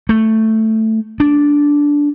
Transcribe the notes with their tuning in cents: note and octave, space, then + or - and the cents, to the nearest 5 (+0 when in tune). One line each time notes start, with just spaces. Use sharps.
A3 +5
D4 -10